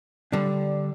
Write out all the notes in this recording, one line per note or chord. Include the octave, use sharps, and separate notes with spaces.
D3 G3 D4